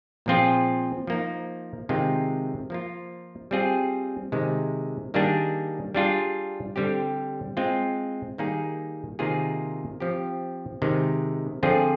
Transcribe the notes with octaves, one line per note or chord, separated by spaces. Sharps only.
A#2 F3 C4 F4 G#4
F3 A#3 D#4
C3 D#3 G#3 C4 F4
F3 A#3 F4
G3 C4 F4 G#4
C3 D#3 G#3
D#3 G3 A#3 D4 G#4
G3 D4 F4 G#4
D3 G3 C4 G4
G#3 C4 F4
D#3 G3 A#3 D#4 G#4
C3 D#3 A#3 F4 G#4
F3 C4 G4
C3 D#3 G#3
D3 F3 C4 F4 G#4